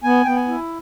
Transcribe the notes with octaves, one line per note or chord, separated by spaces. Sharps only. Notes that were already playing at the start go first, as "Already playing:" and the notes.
B3 G#5
B3 G5
G#5
E4